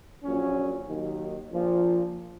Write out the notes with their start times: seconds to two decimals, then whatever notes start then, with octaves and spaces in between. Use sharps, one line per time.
0.24 A#1 A#2 F#3 C#4
0.86 D#2 D#3 F#3
1.51 A#1 A#2 F3